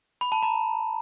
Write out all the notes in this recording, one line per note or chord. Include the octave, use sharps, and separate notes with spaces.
B5
A5
A#5